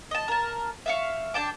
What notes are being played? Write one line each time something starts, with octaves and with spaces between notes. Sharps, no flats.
D#5 A5
A#4 A5
E5 F5 C#6
D4 G5 A5 D6